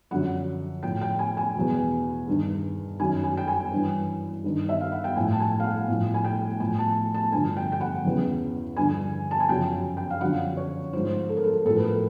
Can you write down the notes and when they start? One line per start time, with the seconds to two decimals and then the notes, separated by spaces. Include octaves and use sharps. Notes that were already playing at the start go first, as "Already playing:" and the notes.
0.11 F#2 D3 F3 F#5
0.83 A2 F3 G5
1.01 G5
1.19 G#5
1.37 G#5
1.55 E2 B2
2.28 G2 D#3
3.00 F#2 D#3 G#5
3.24 G#5
3.37 G5
3.48 G#5
3.72 G2 E3
4.44 G2 D#3
4.69 E5
4.81 F5
4.92 F#5
5.04 G5
5.16 A2 F3 G#5
5.32 A5
5.40 G#5
5.60 F5
5.64 F#5
5.88 A2 F3
6.14 G#5
6.24 G5
6.60 A2 F3 G#5
6.78 A5
7.14 A5
7.32 G2 D3 F3 G#5
7.57 G5
7.72 G5
7.81 F#5
8.05 E2 C#3 E3
8.76 G2 D3 F3 G#5
9.31 A5
9.40 G#5
9.49 F#2 C#3 F3 G5
9.97 G5
10.10 F5
10.21 F#2 D3 F3 F#5
10.57 C#5
10.93 G#2 F3 C5
11.29 A4
11.37 A#4
11.44 A4
11.65 A2 A4
11.69 F3
11.76 B4
11.83 A#4